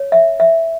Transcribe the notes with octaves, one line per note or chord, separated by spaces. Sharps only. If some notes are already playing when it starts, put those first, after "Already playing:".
Already playing: C#5
E5
E5